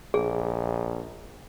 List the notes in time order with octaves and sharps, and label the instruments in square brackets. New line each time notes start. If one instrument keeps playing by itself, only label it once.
[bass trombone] A#1 [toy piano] G#4